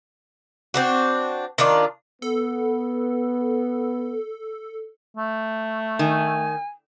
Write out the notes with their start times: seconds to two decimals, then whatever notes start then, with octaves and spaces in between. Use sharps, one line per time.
0.74 C4 D4 F#4
1.58 D#3 D4 F4 D5
2.22 B3 A4
5.17 A3
5.99 D#3 G#5